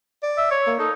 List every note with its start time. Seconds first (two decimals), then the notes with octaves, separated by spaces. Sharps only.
0.23 D5
0.37 E5
0.51 C#5
0.67 A#3
0.79 D#4 A4